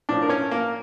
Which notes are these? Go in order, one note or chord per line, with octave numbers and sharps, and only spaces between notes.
A2 F3 D4
A#4
C#4 C#5
A#3 A#4